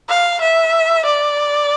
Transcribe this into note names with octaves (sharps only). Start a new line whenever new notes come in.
F5
E5
D5